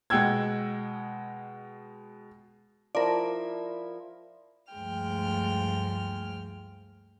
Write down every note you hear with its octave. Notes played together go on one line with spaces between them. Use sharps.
B2 G#3 F#5 G5 E6 G#6
F3 E4 A#4 D5
D2 G2 F3 G#3 G5 F6